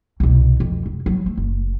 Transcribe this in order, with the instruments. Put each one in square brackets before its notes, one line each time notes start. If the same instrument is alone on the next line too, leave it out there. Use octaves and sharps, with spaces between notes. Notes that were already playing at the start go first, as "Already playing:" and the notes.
[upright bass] C2 B2
F2
F1
A1 F#3
A3
F#1